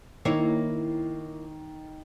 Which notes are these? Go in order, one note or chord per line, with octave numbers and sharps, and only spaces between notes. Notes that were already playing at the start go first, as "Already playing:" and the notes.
D#3 A#3 E4 C#5